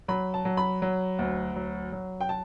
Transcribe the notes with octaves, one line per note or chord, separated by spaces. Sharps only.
F#3 B5
A5
F#3
B5
F#3
D2
F#3
F#3
G5
A5